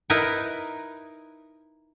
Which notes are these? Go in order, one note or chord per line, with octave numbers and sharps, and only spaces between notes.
D#4 E4 A#4 B4